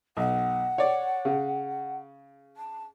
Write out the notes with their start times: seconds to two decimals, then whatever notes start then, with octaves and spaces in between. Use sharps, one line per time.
0.17 B1 F#5
0.78 C#5 D5
1.25 C#3
2.56 A5